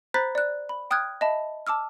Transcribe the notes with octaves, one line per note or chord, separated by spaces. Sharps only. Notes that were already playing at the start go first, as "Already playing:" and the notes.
C5 A#5 B5 F#6 A6 B6
D5 F#6
B5
G5 D#6 F6 F#6 G#6
D#5 E5 A5 B5
A5 D6 E6 F6